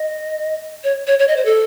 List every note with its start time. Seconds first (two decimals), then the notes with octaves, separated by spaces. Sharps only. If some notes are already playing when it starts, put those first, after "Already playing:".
Already playing: D#5
0.84 C#5
1.07 C#5
1.19 C#5
1.28 D#5
1.37 C5
1.45 A4